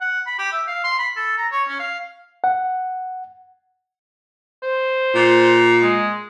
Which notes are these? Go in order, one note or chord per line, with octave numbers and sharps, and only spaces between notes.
F#5
B5
G4
E5
F5
C6
B5
A4
A#5
C#5
C#4
F5
F#5
C5
A#2
G#3